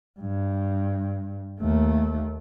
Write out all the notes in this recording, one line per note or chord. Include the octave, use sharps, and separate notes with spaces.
G2
D#2 A3